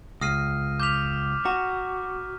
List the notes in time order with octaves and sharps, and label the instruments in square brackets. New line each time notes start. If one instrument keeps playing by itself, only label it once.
[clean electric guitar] C#2 [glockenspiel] D#6 F6 C7 [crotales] A#6 D#7
[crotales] D6 F6 B6 [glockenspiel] G6 F7
[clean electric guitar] F#4 [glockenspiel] A#5